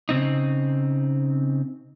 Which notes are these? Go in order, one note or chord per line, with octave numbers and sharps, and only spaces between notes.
C#3 C4 D#4